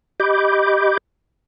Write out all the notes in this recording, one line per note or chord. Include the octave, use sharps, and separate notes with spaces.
G4 D#5 B5 D6 G6